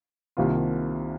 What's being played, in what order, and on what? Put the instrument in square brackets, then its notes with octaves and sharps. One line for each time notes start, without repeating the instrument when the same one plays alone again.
[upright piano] C2 C3 D#3 A#3 F4